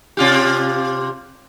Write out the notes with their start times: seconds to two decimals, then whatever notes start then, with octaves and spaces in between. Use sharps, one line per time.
0.17 C3 F4 G4